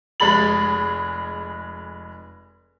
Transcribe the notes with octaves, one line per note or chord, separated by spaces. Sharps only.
F1 G#3 G#4 B5 A6 F#7